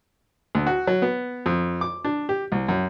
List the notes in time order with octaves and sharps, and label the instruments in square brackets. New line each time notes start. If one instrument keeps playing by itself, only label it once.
[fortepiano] D2
F#4
F#3
B3
F2
D6
D4
G4
C2
F#2